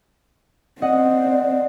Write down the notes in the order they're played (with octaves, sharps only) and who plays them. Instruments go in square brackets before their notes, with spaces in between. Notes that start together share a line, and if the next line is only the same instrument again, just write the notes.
[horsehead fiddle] C4 [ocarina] D5 [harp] D#5 F#5